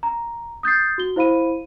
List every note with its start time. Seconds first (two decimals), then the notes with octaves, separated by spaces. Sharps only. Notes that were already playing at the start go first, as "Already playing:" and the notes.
0.03 A#5
0.63 D#6 G6 A6 C7
0.98 F#4 G7
1.16 E4 C5 F5 B5 D#7